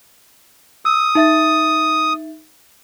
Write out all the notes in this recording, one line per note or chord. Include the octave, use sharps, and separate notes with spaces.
D#6 E6
D#4 E5 A6